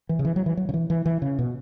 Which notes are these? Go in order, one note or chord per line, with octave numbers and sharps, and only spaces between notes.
E3
C#3
E3
F#3
E3
F#3
C#3
E3
E3
E3
C#3
B2